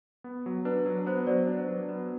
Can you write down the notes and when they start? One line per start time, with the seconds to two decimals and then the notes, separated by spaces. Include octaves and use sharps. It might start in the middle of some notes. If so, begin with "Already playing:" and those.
0.24 B3
0.46 F#3
0.65 D4 B4
0.86 F#3
1.06 B3 C5
1.27 F#3 D5
1.47 D4 C5
1.68 F#3 B4
1.89 B3 B4